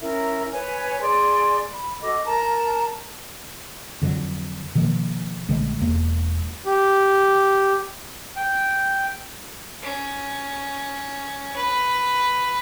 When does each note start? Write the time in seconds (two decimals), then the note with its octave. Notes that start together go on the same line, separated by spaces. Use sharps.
0.01 C#4 E4 A#4 E5
0.53 B4 C#5 G#5
1.02 G#4 D5 C6
1.74 B5
2.01 F#4 A4 D#5 D6
2.26 A#4 A5 A#5
4.02 F2 D3 F#3
4.75 B2 D#3 F3 A#3
5.49 A#1 D3 G#3 A3
5.82 E1 E2 A#3
6.66 G4
8.36 G5
9.83 C#4
11.56 B4